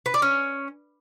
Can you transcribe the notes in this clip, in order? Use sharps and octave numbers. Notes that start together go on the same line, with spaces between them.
B4
D5
C#4